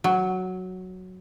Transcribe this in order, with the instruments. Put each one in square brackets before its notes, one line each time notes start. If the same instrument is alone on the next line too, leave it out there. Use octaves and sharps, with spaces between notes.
[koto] F#3